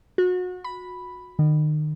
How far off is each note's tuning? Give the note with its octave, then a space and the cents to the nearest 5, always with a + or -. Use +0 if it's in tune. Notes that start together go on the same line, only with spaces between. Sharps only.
F#4 -30
B5 +0
D#3 -35